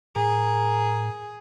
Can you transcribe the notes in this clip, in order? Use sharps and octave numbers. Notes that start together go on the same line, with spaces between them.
A2 G#4 A#4